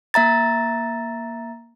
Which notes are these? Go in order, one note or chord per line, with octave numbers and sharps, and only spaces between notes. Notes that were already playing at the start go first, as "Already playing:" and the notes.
A#3 E5 A#5 A6